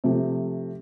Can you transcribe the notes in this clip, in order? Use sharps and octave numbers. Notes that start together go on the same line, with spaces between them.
C3 F3 A3